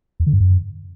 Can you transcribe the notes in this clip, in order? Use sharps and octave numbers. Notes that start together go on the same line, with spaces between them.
E2
D3
G2
F#2